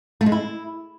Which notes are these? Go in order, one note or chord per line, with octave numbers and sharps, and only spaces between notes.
A3
G#3
E4